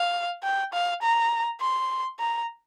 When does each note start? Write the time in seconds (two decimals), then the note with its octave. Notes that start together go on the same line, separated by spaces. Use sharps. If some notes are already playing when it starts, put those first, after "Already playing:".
Already playing: F5
0.43 G5
0.73 F5
1.02 A#5
1.61 C6
2.20 A#5